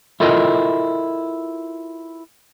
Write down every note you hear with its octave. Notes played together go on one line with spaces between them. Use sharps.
E4 F4 A4 A#4 D#5